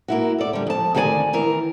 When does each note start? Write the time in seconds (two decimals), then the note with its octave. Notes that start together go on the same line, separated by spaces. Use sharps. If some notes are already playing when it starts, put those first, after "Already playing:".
0.08 A#3 E4 F#4
0.38 A4 D5
0.53 D3 G3
0.67 F2 A5
0.95 D2 D#3 G#4 A4 D5 G#5
1.33 D#3 E3 A#4